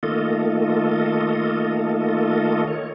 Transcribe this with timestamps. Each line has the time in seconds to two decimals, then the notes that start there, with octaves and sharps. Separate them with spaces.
0.03 D#3 A3 A#3 F4 A4 D#5
2.68 C#5